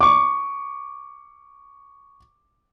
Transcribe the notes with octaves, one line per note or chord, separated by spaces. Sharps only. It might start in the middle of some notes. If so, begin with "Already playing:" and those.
C#6 D6